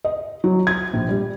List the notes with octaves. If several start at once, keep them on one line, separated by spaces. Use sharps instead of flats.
D#5
F#3
G#6
A#1
G3